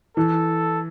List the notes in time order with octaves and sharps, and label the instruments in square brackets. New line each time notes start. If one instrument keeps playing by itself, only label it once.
[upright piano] E3 [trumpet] A4